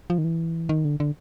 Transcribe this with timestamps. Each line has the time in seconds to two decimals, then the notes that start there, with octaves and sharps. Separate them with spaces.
0.10 F3
0.18 D#3
0.24 E3
0.69 D#3
0.85 D3
1.00 D3